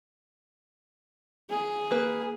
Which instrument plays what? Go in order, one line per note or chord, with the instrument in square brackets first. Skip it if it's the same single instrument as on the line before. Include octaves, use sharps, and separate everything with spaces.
[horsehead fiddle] G#4
[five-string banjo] A#3 B4